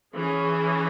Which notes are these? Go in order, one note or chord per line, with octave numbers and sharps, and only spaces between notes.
E3 C#4 G#4